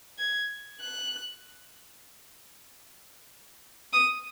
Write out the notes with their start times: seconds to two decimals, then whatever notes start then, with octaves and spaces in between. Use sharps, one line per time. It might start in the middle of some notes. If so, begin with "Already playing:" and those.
0.19 G#6
0.81 F#6
3.93 D#6